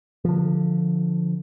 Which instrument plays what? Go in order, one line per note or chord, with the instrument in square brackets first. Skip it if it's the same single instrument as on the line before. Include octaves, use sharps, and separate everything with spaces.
[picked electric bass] D3 F3